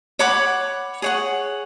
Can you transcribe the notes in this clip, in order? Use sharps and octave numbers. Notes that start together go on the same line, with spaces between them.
C#5 F#5 B5 D6
G#4 C#5 F#5